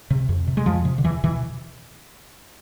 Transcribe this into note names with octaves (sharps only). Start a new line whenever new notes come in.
C3
F2
C3
G#3
F2 F3
C3
D3
E2 E3
B2 E3